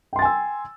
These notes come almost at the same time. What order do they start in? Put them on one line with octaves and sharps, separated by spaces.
G5 C6 A6 G#5 E6